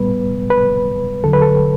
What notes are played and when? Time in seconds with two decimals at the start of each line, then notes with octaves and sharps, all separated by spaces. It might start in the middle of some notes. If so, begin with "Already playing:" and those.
Already playing: A2 G3 B3 B4
0.50 B4
1.23 E2 D3 F#3 A4
1.33 B4
1.42 A4